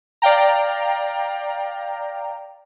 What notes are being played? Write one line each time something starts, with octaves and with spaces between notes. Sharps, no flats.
D5 F5 G5 A#5